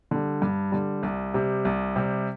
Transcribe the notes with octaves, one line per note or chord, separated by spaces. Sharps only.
D3 G3
G2
D3 G3
C2
C3 G3
C2
C3 G3